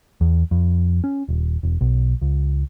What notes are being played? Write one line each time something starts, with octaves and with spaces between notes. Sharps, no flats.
E2
F2
C#4
D#1
E1
B1
C#2